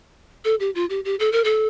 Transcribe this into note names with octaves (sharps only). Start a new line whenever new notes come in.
A4
G4
F4
G4
G4
A4
A#4
A4